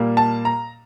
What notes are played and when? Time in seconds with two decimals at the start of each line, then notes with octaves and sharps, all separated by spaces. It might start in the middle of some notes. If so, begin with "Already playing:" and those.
Already playing: A#2 G3 A#3
0.17 A5
0.45 A#5